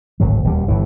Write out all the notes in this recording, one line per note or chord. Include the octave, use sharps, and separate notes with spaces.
D1 G#1 F#3
D#1 D2 G3
G1 G2 E3